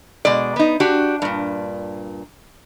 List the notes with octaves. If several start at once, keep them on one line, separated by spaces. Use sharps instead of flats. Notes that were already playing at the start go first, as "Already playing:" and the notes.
B2 G#3 D5
B3 D#4
D4 F#4 G4
G2 A#2